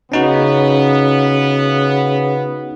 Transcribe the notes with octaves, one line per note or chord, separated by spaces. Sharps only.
C#3 B3 C#4 D#4 F#4